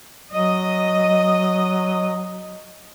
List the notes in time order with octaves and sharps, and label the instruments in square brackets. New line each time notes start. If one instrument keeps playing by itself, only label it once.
[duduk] F#3 [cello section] D#5